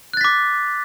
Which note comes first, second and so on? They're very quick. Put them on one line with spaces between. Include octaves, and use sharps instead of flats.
F#6 A6 B6 D6